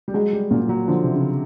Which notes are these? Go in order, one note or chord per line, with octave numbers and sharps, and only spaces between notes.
G3
F#3 G#3
G3
A#2 F#3
F#3
D3 F3
C3
C#3